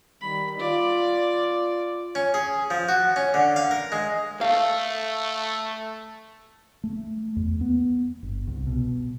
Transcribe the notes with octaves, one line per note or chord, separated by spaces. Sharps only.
D#3 G3 B5
F4 D5
C#4
G#4
F3
F#4
C#4
D3
F5
A#4
G#3
A3 F5
A3
E2
B3
G1
C2
B2